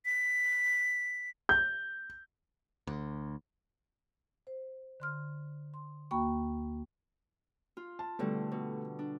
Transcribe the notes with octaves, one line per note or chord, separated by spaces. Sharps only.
B6
G6
D2
C5
D3 C6 F6
C6
D2 A#3 F#4 G5 B5 C#6
F4
A5
B2 D3 G3 A3
B2
D4